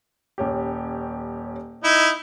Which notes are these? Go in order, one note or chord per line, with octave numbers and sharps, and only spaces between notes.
D#1 C#4 G4
D#4 E4